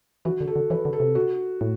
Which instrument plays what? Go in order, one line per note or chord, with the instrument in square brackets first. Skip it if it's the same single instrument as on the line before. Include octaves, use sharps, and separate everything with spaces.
[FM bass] E3 [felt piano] F#4
[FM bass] D3
[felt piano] A4
[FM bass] D3
[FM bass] E3 [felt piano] B4
[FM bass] D3
[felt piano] A4
[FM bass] C3
[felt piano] F#4
[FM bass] A2